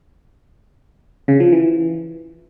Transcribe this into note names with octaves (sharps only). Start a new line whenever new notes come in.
C#3
F3
E3